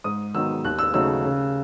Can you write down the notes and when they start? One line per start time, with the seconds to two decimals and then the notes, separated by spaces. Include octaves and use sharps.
0.04 G#2 D#6
0.34 D#3 F#3 B3 D#4 E6
0.65 D#2 F#6
0.79 E6
0.94 C#3 F#3 A3 D#4 E6
1.24 C#3